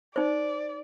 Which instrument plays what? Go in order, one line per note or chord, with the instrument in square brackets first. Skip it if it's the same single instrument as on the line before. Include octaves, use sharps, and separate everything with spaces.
[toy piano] D#4 C5 [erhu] D5